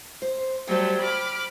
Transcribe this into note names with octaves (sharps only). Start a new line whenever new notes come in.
C5
F#3 G3 A3 C5 G5
B5 D6 F6